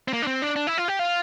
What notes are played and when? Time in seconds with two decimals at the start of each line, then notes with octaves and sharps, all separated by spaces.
0.08 C4
0.13 A#3
0.22 D4
0.27 C4
0.42 D4
0.56 D4
0.67 E4
0.78 F4
0.88 G4
0.99 F4